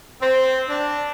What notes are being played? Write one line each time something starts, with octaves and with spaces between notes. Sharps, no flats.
C4
D4